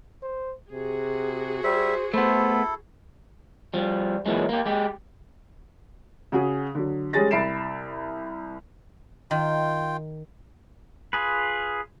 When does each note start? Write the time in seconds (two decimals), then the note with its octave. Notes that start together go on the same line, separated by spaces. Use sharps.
0.23 C5
0.72 C3 F#4 G#4
1.64 G3 C5 E5
2.14 A3 B3 E4 A4 C5
3.74 F3 G3
4.26 A#2 E3 F#3 G#3
4.49 A#3 G4
4.66 G#3 G4
6.32 C#3 F#4 G#4
6.75 D3 F#3
7.13 G3 G#3 C#4 G#4 A6 A#6
7.31 C2 E5 B5 C7 D7 E7
9.31 D#3 F4 G5
11.13 F4 G#4 B4